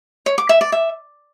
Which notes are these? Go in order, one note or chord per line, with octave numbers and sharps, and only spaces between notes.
C#5
D6
E5
D5
E5